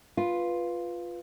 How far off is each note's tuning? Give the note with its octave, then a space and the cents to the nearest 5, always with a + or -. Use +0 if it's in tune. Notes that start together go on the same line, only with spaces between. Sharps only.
F4 +0 B4 +0